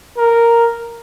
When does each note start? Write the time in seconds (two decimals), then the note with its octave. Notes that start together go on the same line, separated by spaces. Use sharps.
0.17 A#4